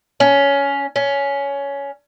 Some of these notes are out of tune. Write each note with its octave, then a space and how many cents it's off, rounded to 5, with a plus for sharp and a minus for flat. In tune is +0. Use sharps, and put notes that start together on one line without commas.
C#4 +15
C#4 +15